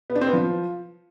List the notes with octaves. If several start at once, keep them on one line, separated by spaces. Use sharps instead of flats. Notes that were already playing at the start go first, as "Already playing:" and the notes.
B3
D4
C4
B3
F3